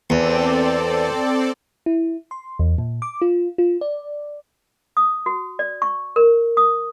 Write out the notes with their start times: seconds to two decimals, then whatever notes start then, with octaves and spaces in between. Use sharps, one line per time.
0.10 E2 C4 A4 D5
1.86 E4
2.31 C6
2.59 E2
2.78 A#2
3.02 D6
3.22 F4
3.58 F4
3.81 D5
4.97 D#6
5.26 F#4
5.59 D5
5.82 C#6
6.16 A#4
6.57 D#6